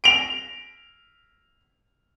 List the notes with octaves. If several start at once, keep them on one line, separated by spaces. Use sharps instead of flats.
D7 F7